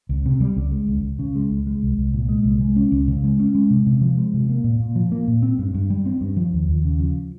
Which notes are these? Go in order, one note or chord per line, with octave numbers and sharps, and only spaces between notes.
C#2
C3
G3
C#2
G#3
C#2
C#2
C#3
G#3
C#2
G#3
C2
C2
A#2
G#3
C2
G#3
C#4
C#2
C#3
G#3
C#4
G#3
C3
C3
F3
G#3
C3
A#3
A#2
A#2
F3
A#3
A#2
C4
G2
G2
G3
C4
G2
F3
D#2
D#2
C#3
F3